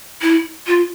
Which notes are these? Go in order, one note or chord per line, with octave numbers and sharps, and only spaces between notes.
E4
F4